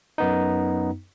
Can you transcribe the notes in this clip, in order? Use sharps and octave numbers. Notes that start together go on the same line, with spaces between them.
F#2 B3 D#4